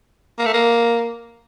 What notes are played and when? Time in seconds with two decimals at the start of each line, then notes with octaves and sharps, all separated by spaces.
0.38 A#3
0.46 A3
0.54 A#3